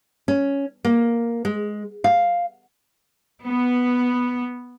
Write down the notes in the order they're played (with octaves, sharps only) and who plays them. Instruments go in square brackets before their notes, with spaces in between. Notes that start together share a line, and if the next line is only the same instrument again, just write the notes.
[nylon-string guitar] C#4
A#3
G#3
F5
[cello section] B3